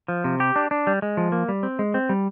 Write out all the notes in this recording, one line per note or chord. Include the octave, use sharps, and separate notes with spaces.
F3
C3
G4
D4
D4
G3
G#3
F3
A#3
G3
C4
G#3
C4
G3